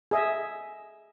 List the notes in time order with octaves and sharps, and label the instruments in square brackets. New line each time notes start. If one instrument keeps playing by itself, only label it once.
[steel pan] G#4 D#5 E5